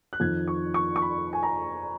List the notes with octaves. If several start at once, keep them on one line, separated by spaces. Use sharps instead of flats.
F#6
F2 D#3 G#6
C#6
C#6
C#6
B5
G#5
A#5